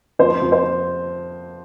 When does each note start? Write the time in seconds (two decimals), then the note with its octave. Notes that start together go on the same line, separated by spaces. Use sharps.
0.19 F2 C5
0.41 F2
0.52 C5